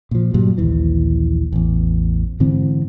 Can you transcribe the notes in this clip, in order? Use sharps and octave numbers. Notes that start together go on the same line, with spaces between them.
A#2 F3
G2 A#2 F#3 G3
A#1 D#2 E3
A1 E2
G#2 D3 E3 C4